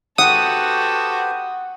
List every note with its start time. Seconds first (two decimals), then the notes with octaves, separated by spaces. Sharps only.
0.18 F#4 G4 A4 B4 C5 F#5 D#6